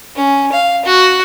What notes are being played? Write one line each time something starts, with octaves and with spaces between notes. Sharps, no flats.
C#4
F5
F#4